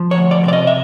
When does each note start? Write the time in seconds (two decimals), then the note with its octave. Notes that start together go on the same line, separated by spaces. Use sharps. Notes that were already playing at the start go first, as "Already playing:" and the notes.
Already playing: F3
0.11 C#5
0.18 D2
0.31 D5
0.45 C3 D5
0.53 D#5
0.67 E5